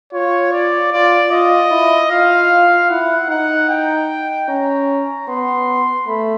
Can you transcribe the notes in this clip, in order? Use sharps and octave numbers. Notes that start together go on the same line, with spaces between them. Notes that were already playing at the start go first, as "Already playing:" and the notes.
F4 C#5
D5
F4 D5
F4 D#5
E4
F4 F5
E4 F#5
D#4 F#5
G5
C#4 A#5
B3 C6
A3 B5